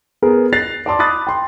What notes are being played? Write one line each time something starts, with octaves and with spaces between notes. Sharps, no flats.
B3 G#4 A#4
F#6 A6 A#6 C7 F7
D5 A5 C6 D6
B5 D6 D#6 F#6 A6
G5 C6